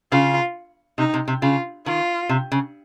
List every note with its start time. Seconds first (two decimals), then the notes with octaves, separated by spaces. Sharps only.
0.11 C#3 F4
0.98 C3 D#4
1.14 C3
1.28 C3
1.42 C#3 F4
1.86 D#3 F4
2.29 C3
2.52 C#3